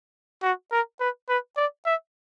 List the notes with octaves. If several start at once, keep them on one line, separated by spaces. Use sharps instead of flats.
F#4
A#4
B4
B4
D5
E5